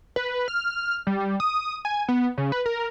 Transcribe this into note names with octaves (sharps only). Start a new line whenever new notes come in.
B4
F6
G3
D#6
G#5
B3
C#3
B4
A#4